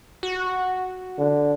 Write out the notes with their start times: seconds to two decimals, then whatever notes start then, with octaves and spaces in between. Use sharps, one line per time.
0.23 F#4
1.18 D3